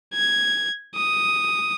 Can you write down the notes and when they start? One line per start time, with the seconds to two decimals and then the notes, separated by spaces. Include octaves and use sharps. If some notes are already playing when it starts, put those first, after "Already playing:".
0.14 G#6
0.96 D#6